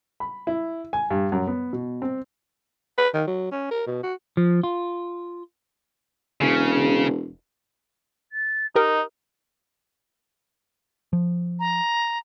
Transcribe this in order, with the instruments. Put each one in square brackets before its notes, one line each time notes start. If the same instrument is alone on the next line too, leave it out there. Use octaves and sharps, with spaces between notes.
[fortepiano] B5
E4
G#5
G2
F#2
B3
B2
C4
[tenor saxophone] B4
D#3
F#3
C#4
A#4
B2
F#4
[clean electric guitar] F3
F4
[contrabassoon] E1 [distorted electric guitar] C#3
[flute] A6
[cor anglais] D#4 [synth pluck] G4 A#4 [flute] D#5
[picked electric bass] F3
[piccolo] A#5